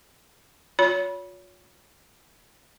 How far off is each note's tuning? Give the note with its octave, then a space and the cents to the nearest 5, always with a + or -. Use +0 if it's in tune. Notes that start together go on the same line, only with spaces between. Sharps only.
F4 +45 C#5 +30 B5 -25